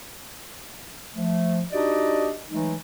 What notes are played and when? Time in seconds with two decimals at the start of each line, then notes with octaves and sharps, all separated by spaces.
1.15 F3 A3
1.71 D4 D#4 F#4 G4 D5 D#5
2.49 E3 F#3 G#3 A3 D#4